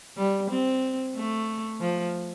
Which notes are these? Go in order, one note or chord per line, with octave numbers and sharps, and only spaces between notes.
G3
C4
A3
F3